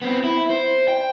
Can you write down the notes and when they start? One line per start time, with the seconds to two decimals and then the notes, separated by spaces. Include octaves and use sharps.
0.02 B3 C4
0.24 E4
0.50 C5
0.88 G5